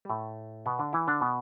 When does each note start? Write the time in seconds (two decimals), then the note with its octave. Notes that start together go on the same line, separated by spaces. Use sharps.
0.05 G3
0.09 A2 A3
0.66 B2 B3
0.79 D3 D4
0.93 E3 E4
1.08 D3 D4
1.21 B2 B3